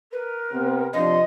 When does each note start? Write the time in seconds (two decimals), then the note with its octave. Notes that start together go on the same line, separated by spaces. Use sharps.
0.13 A#4 B4
0.51 C3 B3 C4
0.93 C3 F3 D4 D#5 C6